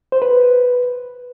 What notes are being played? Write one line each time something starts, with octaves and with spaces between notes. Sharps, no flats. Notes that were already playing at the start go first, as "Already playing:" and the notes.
C5
B4